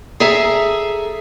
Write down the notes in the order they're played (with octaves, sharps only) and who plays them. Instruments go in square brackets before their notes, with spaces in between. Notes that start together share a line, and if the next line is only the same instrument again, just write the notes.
[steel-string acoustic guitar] G#4 A4 E5 A#5